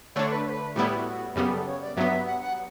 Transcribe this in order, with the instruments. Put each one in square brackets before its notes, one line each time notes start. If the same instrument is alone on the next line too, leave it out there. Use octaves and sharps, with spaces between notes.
[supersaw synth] D3 A3 D4 [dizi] C#5
[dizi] B4
C#5
B4
[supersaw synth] A2 G3 B3 E4 [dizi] G4
[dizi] G4
F#4
[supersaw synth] F#2 C#3 G3 B3 [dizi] G4
[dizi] A4
C#5
D5
[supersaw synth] G2 F#3 B3 [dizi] E5
[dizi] F#5
F#5